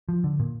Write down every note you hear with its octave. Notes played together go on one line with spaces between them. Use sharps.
F3
D3
A#2